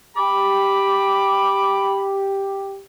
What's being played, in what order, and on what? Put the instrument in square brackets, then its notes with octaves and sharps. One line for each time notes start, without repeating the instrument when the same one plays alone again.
[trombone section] G4 [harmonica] B5 [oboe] D6